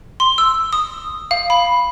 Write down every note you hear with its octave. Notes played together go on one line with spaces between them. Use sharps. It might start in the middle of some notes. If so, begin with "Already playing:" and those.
C6
E6
D#6
F5
B5